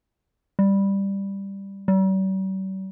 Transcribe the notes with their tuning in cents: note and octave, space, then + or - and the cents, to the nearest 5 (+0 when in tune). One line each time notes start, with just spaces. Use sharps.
G3 +5
G3 -45